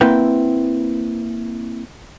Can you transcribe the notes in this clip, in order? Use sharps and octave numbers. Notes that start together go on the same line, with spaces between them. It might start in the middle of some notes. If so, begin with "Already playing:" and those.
A#3 C4 E4 B4 F#5 G5